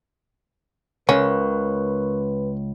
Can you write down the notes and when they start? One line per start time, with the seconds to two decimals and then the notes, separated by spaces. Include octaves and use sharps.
1.09 C#2 C#4 A#4 B4 C#6 F#6